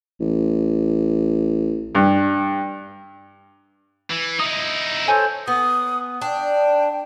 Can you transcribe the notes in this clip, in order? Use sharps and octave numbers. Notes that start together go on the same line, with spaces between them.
A1
G2
E3
D#4 E4 D#6
A4 C5 C#5 G#5
B3 D#6
D4 G5